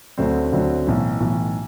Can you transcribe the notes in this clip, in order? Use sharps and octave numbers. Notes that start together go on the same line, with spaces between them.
D2 D3 F#3 A3 C4
D2 D3 F#3 A3 C4
B1 A2 E3
B1 A2 E3